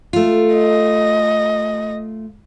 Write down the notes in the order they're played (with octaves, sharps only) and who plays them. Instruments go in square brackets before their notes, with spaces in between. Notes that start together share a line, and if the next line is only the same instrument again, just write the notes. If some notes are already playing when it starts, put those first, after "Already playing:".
[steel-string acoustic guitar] A3 F4
[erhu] D#5